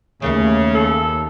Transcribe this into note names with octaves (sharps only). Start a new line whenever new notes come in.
D#2 C#3 A3 A#3 C#4
A4